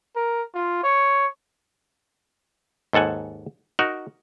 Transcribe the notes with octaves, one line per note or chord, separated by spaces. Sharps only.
A#4
F4
C#5
D#2 G#2 A4 F#5 G#5
D#4 F#4 A#4